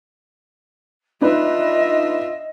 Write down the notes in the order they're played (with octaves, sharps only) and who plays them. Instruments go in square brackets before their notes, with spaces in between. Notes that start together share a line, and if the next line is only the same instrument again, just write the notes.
[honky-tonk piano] D4 D#4 B4 [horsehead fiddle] F4 E5 [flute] D#5